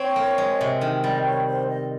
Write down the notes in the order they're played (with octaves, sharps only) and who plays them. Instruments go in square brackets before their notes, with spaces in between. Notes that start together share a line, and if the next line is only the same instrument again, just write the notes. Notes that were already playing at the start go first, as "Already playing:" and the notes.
Already playing: [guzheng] C4 [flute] C#5
[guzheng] A#3
G#3
C3
D#3
[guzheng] G3 [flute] D#5
[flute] C#5
C5
D#5